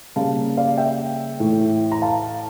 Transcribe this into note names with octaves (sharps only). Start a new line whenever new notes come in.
C#3 G3 A#3 F5 A5
D5 F5
E5 G5
A2 E3 A3
A#5
F5 A5